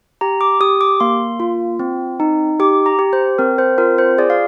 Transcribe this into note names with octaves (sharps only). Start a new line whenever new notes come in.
G4 A#5
D6
G4 D#6
D6
A#3 C6
F4
C4
D#4
G4 D6
A#5
G4
C5
C4 A#4
C5
F4 A#4
C5
G#4 D5
F5